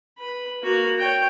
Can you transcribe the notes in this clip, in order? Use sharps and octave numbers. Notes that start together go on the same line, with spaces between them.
B4 B5
A#3 F#4
C#5 G5